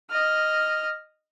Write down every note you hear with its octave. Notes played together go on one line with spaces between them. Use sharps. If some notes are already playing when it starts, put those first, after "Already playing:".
D#5 F6